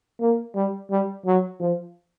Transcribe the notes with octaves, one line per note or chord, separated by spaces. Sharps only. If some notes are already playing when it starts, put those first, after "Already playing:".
A#3
G3
G3
F#3
F3